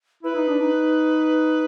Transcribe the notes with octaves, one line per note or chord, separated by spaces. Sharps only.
E4 B4
D#4
D4
D#4